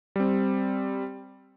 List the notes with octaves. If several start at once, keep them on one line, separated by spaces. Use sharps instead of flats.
G3 C4